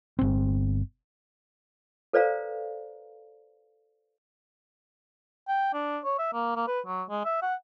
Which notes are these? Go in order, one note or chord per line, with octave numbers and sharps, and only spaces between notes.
G1 C4
A4 B4 C5 D5 F5 A#5
G5
D4
C#5
E5
A#3
A#3
B4
F#3
G#3
E5
F#5